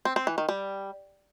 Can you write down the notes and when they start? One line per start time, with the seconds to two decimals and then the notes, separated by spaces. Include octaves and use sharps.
0.05 C4
0.16 C4
0.27 E3
0.38 D#3
0.49 G3